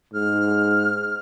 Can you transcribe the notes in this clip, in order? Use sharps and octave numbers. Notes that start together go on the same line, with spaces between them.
G#2 F6